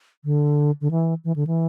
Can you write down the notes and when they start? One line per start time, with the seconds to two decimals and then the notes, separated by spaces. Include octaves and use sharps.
0.25 D3
0.81 D3
0.91 E3
1.24 E3
1.36 D3
1.47 E3